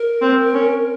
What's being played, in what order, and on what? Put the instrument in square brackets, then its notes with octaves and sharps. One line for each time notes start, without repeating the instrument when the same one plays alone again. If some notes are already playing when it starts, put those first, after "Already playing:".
Already playing: [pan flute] A#4
[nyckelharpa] C4
C#4